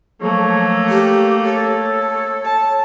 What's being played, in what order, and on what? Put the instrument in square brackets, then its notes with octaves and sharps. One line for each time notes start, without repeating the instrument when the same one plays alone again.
[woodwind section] F3 F#3 C#5 [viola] A3 A#3
[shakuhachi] G4
[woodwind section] A4 [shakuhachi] C#5
[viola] A5